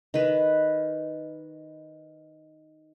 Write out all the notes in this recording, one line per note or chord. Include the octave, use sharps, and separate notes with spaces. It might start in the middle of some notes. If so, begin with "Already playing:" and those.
D#3 B4